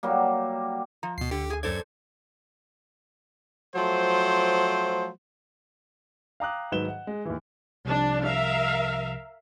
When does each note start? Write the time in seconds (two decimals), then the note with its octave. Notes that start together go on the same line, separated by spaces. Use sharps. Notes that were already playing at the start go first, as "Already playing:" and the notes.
0.03 F#3 G3 A#3
1.03 F3 A#5
1.18 D2 B2 C7
1.31 D3 G4
1.50 G#4 G#5
1.63 F#2 A4 C5 D5 G#6
3.76 F3 F#3 A3 C5
6.40 F5 G5 A#5 D6 D#6 F#6
6.72 G#2 D#3 F#3 B4 E7 G7
6.88 F#5
7.07 G#3
7.25 D#2 E3
7.85 C2 C3 F3 D4
8.21 A#4 E5 F5